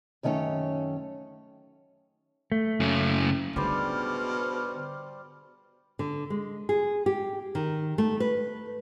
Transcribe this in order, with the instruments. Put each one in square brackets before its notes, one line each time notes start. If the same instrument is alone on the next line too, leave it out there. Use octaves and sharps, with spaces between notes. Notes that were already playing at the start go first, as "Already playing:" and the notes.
[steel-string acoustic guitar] F#2 D#3 A3 C#4 C#5
[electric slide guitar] A3
[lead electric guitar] F#2 C#3
[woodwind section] G#2 F6 [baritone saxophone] B2 [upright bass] D3 [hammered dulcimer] G3 C5 D5
[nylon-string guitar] D3
G#3
G#4
G4
D#3
A3
B4